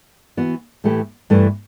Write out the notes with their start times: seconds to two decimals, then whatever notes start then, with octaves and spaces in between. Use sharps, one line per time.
0.37 E3 B3 F#4
0.84 A2 E3 A3 E4 G4
1.30 G2 E3 A3 E4